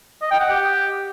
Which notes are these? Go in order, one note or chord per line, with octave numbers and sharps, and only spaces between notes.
D#5
G5
F#5
G4